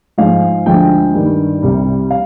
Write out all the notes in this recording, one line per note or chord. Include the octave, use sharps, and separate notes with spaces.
G#2 F3 G#3 F5
D2 D3 F3 G#3 G5
G2 D#3 G3
C2 C3 G3
F5